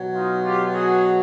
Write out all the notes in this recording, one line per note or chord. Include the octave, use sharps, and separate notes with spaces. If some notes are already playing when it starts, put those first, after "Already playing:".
Already playing: B2 F#3
D#4 F4
F4 G4
F#4 G#4